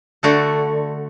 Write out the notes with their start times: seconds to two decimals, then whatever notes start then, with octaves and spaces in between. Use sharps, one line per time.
0.23 D3 A3 F#4 A4